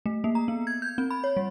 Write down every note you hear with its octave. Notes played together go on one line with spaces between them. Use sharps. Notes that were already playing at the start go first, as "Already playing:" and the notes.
A3
A#3
A#5
B3
G#6
G6
C4
B5
C#5
G3